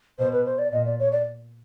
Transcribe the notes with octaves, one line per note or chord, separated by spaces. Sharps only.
B2 C5
B4
C5
D5
A#2 D#5
D5
C#5
D5